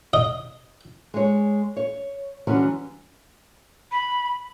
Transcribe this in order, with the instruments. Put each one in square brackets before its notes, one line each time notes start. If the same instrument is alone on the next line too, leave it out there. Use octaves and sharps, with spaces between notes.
[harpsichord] D#5
[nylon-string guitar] G#3 C#5
C#5
D3 E3 F#3 G3 C#4
[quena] B5